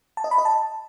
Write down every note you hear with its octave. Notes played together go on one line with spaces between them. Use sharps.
A5
D#5
B5
D#5
A5